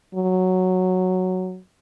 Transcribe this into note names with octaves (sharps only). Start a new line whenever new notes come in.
F#3